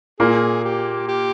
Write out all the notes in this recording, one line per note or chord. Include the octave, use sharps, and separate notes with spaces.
A#2 A#3 G#4
G4
G4